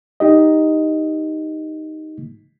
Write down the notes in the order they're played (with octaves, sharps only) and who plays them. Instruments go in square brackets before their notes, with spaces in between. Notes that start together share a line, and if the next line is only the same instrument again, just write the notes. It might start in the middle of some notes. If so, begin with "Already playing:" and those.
[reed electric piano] D#4 G4 D#5